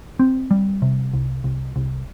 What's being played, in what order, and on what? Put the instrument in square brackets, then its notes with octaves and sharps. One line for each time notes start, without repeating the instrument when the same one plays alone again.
[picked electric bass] C4
G3
C3
C2
C2
C2